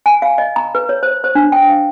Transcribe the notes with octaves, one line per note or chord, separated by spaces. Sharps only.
G#5
F5
D#5
A#5
B4
C#5
C5
C5
D4
G5
F5